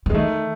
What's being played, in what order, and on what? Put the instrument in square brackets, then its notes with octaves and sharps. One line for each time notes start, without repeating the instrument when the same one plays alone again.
[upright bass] E3
[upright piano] G#3
[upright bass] D#3 [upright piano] A3